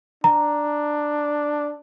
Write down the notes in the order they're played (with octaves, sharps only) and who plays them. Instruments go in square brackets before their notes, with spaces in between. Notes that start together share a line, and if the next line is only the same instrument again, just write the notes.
[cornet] D4 [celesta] A#5